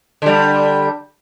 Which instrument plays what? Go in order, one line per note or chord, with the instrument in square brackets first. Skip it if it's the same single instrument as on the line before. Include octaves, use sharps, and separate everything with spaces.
[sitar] D3 G3